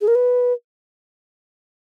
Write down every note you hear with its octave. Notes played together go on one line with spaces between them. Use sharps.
G#4
A#4
B4